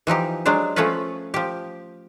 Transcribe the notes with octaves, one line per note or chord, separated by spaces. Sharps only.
E3 F3 D#4 G4
F#3 G#3 D4 C5
F3 A3 C#4 F4 B4
F3 G4